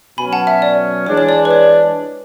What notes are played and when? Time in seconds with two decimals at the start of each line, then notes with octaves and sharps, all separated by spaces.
0.18 B2 F#3 C#4 G#5 B5
0.33 F#5 A5
0.47 E5
0.62 D5
1.06 E3 G#3 D4 G#4 C#5
1.17 C#5
1.29 D5
1.45 B4
1.51 C#5